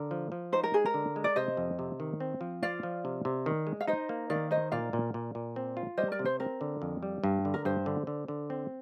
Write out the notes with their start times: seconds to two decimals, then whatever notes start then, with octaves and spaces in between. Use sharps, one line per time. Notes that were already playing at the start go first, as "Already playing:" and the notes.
Already playing: D3 A#4
0.11 F3
0.32 F3
0.53 D#4 C5
0.64 A#4
0.74 G#3 G#4
0.86 A#4
0.94 D3
1.16 G#3
1.24 D5
1.36 C3 C5 D#5
1.57 F2
1.79 C3
2.00 D#3
2.20 C4
2.41 F3
2.63 F4 D5 F5
2.83 F3
3.05 C3
3.25 C3
3.46 D#3
3.67 G#3
3.81 F5
3.87 D#4 C5 D#5
4.09 A#3
4.30 D#3 D5 F5
4.51 D#4 C5 D#5
4.72 A#2 D5 F5
4.93 A#2
5.14 A#2
5.35 A#2
5.56 C4
5.77 F4
5.97 G3 C5 D#5
6.12 A#4 D5
6.19 C3
6.25 C5
6.40 C4 A#4
6.61 D3
6.82 F2
7.03 G3
7.24 G2
7.45 D3
7.54 A#4
7.65 G2 C5
7.86 D3
8.07 D3
8.28 D3
8.50 C4